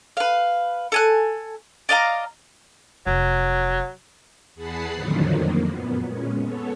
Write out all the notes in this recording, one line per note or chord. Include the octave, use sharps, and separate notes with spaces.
B4 F5
A4 G#5 F#6
D5 D#5 F5 A#5
F1 F#3
E2 G#4 F#5 A5 B5 C7
F2 A2 D3 D#3 F3 F#3
F2 A#3
F#2 A#2 B3
A#2 G#3 C#4
B3 A4 C#5